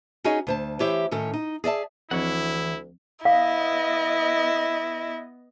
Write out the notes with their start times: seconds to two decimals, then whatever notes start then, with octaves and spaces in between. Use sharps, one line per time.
0.24 C#4 D#4 F#4 G#4 C#5 D#5
0.47 D2 C5 A5
0.80 E3 E4 G4 C5 C#5
1.11 A2 D#3 C#4 A4
1.34 D#4
1.64 G#4 D5 E5 A5
2.11 D2 E3 F3 C4 E4 C#5 F#5
3.25 B3 E4 D#5 F5